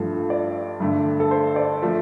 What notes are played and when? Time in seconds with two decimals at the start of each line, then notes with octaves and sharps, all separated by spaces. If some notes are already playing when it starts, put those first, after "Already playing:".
Already playing: G2 F3 A3
0.30 D5
0.80 G2 D3 A3
1.20 A4
1.31 C5
1.56 D5
1.82 F3 A3